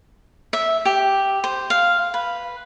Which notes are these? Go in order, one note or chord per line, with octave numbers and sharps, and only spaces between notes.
E5
G4
C5
F5
B4